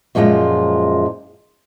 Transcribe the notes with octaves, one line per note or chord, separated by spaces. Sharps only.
F#2 A#2 F3 G#3 F4